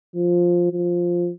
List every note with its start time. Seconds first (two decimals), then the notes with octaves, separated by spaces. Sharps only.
0.16 F3
0.72 F3